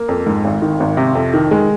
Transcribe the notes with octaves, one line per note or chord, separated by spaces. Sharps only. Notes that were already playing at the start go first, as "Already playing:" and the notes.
Already playing: A#3
F2
G#2
G#1
D#3
G#1
C3
F2
D#3
G#3